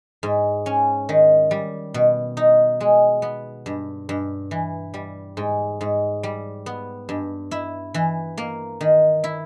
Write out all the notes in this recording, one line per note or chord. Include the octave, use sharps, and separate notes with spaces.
G#2
C#4
D#3
G3
B2
D#4
G#3
B3
G2
G2
E3
G3
G#2
G#2
G3
B3
G2
E4
E3
A#3
D#3
E4